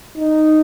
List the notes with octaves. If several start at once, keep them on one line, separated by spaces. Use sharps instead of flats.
D#4